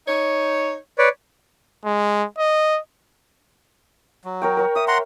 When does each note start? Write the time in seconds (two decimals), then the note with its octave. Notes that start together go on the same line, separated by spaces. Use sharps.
0.07 D#4 C#5
0.98 B4 C#5 D5
1.85 G#3
2.38 D#5
4.24 F#3
4.42 A#4 C#5 G5
4.57 A#4 C#5
4.76 E5 D#6
4.88 F#5 A#5 C6